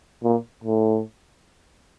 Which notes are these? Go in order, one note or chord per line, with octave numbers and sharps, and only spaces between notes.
A#2
A2